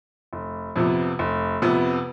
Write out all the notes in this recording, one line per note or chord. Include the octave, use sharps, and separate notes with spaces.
F1
F2 C3 F3 B3
F1
F2 C3 F3 B3